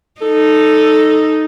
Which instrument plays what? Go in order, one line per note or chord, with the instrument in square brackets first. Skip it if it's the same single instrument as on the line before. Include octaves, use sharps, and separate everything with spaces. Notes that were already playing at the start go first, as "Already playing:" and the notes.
[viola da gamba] D#4 [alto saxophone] A4